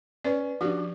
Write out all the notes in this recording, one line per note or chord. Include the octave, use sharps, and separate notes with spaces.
C#4 B4 D5
F3 D4 F#4 G4 D5
F3